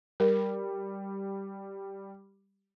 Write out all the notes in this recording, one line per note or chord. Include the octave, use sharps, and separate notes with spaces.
G3 A#4